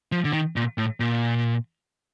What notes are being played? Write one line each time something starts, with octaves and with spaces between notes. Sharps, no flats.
F3
D3
D#3
A#2
A2
A#2